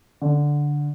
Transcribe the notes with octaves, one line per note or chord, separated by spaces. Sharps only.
D3